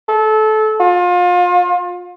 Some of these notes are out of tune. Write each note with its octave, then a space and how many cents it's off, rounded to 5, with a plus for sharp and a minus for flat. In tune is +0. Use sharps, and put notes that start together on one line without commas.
A4 -25
F4 +30